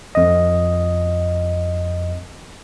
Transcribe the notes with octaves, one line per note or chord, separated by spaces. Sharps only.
F2 D#5